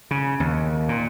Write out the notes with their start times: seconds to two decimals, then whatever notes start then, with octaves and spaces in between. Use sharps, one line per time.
0.11 C#3
0.40 D#2
0.89 A#2